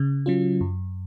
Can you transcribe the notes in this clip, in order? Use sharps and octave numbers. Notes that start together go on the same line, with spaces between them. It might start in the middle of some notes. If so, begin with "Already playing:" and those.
Already playing: C#3
F#3 C#4 F4
F#2